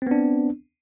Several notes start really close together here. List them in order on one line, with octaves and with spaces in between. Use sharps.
C4 B3 D4